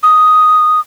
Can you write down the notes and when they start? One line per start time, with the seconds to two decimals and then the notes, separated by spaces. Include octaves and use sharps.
0.03 D#6